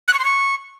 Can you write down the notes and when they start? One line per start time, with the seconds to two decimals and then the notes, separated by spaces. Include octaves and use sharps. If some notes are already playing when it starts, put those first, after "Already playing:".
0.08 F#6
0.14 C#6
0.19 C6
0.25 C#6